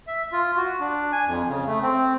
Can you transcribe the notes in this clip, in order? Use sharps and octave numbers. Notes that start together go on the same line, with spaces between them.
E5
F4
F#4
D4
G#5
F2
C#3
A3
C4